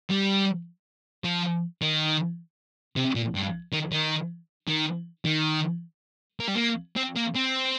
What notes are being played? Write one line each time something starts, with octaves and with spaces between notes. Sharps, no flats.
G3
F3
D#3
C3
A#2
G2
D#3
D#3
D#3
D#3
A#3
G3
A#3
C4
A#3
C4